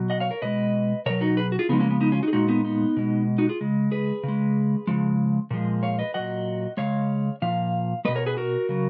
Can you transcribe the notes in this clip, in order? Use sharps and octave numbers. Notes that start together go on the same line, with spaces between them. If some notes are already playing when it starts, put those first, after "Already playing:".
Already playing: B2 F#3
D#5 F#5
C#5 F5
A#4 C#5
B2 G#3 B4 D#5
B2 F#3 A#4 C#5
D#4 F#4
G#4 B4
F#4
F4 G#4
C#3 F3 G#3 B3 D#4
A#3 C#4
B3
B3 D#4
C#4 F4
D#4 F#4
G#4
A#2 G#3 D#4 F#4
B3 D#4
B3 D#4
B2 G#3
D#4 F#4
F4 G#4
C#3 G#3
G#4 B4
C#3 G#3
C#3 F3 G#3
A#2 F3 G#3
C#5 F5
B4 D#5
A#2 F#3 D#5 F#5
C#3 G#3 C#5 F5
A#2 F3 F5
B2 G#3 B4 D#5
A#4 C#5
G#4 B4
F#4 A#4
C#3 F#3